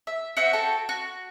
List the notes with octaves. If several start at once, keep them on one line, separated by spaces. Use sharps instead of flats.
E5
F#4 C5 E5 F#5
F#4 A4 G5
F#4